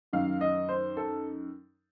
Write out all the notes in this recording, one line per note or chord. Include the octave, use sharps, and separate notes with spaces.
F#2 D#3 F5
D#5
C5
A4